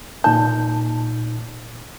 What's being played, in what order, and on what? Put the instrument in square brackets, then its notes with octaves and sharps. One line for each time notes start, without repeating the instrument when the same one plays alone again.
[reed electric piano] A#2 D#4 G6 [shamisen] A5